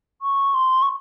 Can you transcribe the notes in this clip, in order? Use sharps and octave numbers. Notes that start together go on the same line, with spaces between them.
C#6
C6
C#6